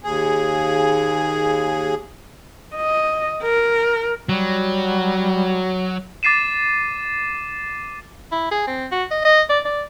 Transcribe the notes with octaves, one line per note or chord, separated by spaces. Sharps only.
D#2 G#4
D#5
A#4
F#3 G3
D6 A6 C7 D#7 E7
E4
G#4
C4
F#4
D#5
D#5
D5
D5